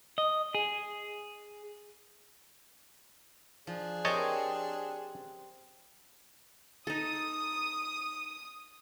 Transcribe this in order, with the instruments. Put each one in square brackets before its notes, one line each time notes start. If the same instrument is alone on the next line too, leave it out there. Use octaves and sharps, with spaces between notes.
[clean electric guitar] D#5
G#4
[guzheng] F3 [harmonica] D4 G#4
[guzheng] C4 G4 A#4 [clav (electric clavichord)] C#5 D#5 A5
[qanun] D#4 A4 [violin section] D#6